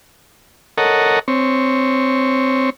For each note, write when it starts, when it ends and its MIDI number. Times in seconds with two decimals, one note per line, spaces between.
0.78 1.19 69
0.78 1.19 70
0.78 1.19 73
0.78 1.19 75
0.78 1.19 78
1.28 2.70 60
1.28 2.70 73